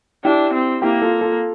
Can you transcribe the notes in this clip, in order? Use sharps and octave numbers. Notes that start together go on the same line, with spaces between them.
D4 E4 G4
C4
A#3 E4 G4
F4 A4
F4 A4